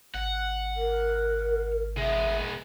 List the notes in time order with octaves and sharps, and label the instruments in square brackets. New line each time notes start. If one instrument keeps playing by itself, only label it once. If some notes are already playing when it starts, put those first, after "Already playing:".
[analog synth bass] G#1 [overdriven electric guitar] F#5
[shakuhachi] A#4
[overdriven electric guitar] G#3 B3 [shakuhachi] E5